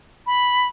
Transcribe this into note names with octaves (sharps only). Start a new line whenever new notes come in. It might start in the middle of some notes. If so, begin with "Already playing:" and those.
B5